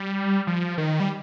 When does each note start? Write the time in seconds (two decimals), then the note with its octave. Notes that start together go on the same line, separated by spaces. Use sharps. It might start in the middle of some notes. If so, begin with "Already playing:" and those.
Already playing: G3
0.47 F3
0.78 D#3
1.00 G3